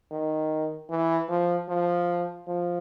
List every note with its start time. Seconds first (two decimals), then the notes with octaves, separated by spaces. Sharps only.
0.11 D#3
0.90 E3
1.29 F3
1.69 F3
2.48 F3